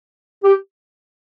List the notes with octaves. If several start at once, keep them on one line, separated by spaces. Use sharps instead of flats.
G4